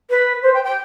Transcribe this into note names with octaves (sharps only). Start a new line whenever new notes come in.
B4
C5
G5
G5